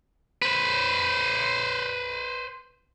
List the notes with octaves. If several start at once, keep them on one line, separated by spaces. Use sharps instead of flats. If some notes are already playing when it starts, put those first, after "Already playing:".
B4 C5